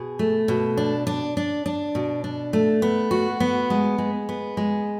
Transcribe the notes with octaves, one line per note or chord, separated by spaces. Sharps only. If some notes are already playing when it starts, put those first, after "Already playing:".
Already playing: B2 G#4
A3
B2
D4
D4
D4
D4
B2
D4
A3
B3
F#4
B3
G#3
G#3
B3
G#3